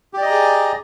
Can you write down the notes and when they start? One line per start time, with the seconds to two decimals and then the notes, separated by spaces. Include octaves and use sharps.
0.14 G4
0.18 D5
0.22 D#5
0.26 A#5
0.30 G#4